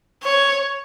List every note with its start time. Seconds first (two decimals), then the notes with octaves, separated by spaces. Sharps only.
0.24 C#5